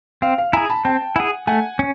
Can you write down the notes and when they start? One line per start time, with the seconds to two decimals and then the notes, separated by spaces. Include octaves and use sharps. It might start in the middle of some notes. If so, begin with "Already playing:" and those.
0.22 C4 F5
0.38 F5
0.53 E4 G#4 G#5 A#5
0.70 A5 B5
0.85 C4 G5 A5
1.16 E4 G#4 F#5 G#5
1.47 A3 F#5 G#5
1.79 C#4